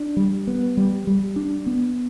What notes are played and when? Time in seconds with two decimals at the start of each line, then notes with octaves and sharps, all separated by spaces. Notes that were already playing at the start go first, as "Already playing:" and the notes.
Already playing: D4
0.17 G3
0.47 B3
0.77 G3
1.07 G3
1.36 D4
1.67 B3